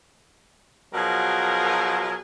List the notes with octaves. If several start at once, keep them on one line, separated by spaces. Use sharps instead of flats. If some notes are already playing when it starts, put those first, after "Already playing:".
B2 F3 F#3 G#4 A#4